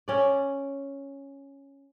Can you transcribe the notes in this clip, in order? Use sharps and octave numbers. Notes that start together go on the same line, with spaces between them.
C#4 D5